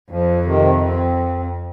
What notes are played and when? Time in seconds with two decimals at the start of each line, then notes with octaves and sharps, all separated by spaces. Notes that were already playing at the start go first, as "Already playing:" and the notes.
0.10 F2 F3
0.45 C3 D#3
0.83 C4